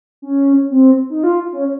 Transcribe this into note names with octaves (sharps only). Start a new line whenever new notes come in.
C#4
C4
D#4
F4
C#4